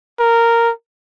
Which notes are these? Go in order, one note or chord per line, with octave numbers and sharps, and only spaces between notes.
A#4